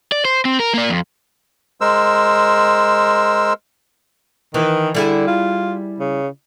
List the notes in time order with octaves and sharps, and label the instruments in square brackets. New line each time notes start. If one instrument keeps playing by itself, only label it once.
[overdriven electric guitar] D5
C5
C4
A#4
A#3 D5
F2
[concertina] G#3 A#4 C5 E6
[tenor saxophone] D#3 [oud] E3
[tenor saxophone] D3 [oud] G3 E4 G#4
[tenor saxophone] F4
C#3